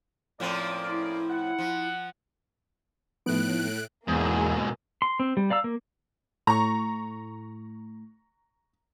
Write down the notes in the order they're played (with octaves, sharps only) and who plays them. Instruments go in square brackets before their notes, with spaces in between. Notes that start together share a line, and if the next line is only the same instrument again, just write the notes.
[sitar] A2 F3 C4 [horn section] A#3 C#4 D5
[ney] E4
[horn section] F#5
[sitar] F3
[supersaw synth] A2 F#6 D7 [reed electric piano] F3 B3 D#4
[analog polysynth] E2 [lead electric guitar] G#2 B2 [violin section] A#3 G#4
[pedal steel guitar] C6
C4
G3
D5 F5 A#5 E6
A#3
[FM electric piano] A2 [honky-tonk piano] A#5 C#6